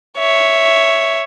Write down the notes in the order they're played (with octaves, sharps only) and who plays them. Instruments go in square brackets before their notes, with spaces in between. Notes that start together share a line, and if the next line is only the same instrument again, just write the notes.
[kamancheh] C#5 E5